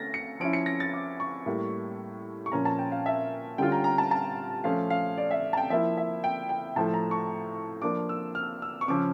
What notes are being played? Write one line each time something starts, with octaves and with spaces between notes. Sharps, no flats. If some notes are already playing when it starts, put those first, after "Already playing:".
Already playing: A3 C#4 A6 A#6
C#7
F3 C#4 E4 D7
C#7
A#6
A6
D6
C#6
A2 G3 A#3 E4
C#6
A#2 F3 C#4 A#5
A5
G5
F5
E5
D3 G3 C#4 F4 G5
A#5
A#5
A5
A5
F3 A3 C#4 F5
F5
D5
E5
A5
G5
F3 A#3 E4 E5
E5
G5
G5
A2 F3 A3 A5
A#5
C#6
F3 A#3 D4 D6
E6
F6
E6
C#6
C#3 F3 C#4 D6